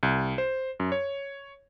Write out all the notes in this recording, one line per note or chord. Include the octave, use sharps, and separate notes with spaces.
C2
C5
F#2
C#5